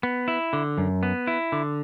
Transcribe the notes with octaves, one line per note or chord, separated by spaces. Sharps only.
B3
E4
D3
F#2
B3
E4
D3